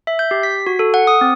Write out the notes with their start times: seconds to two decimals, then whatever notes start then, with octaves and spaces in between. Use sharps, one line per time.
0.07 E5
0.19 G6
0.31 G4
0.43 B6
0.67 F#4
0.79 A4
0.94 F#5
1.07 D#6
1.21 C4